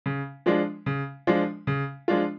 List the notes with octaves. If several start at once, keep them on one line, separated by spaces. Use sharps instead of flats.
C#3
F3 G#3 D4 F4
C#3
F3 G#3 D4 F4
C#3
F3 G#3 D4 F4